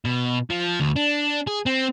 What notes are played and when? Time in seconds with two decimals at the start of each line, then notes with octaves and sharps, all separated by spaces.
0.05 B2
0.50 F3
0.80 D2
0.96 D4
1.47 G#4
1.66 C4